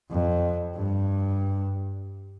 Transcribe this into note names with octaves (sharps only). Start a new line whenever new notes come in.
F2
G2